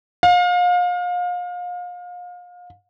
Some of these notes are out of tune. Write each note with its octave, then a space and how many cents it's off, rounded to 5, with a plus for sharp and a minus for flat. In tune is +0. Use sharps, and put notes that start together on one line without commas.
F5 +35